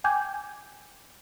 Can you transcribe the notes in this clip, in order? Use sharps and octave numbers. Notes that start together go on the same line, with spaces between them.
G5 G#5 D6 G6 G#6